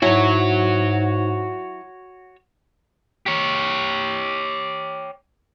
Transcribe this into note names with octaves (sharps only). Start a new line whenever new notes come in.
G#2 F#3 E4 F#4 C#5
G4 C#5